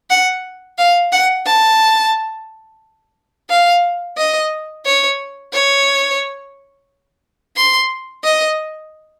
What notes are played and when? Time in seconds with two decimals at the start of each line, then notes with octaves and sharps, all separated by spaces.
0.10 F#5
0.79 F5
1.12 F#5
1.46 A5
3.49 F5
4.17 D#5
4.85 C#5
5.53 C#5
7.56 C6
8.24 D#5